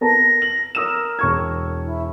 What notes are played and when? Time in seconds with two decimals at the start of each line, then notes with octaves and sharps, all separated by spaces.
0.01 B3 A#4 A5 A#6
0.42 F#7
0.75 A#4 D#6 E6 E7
1.19 E1 C#6 G#6
1.85 E4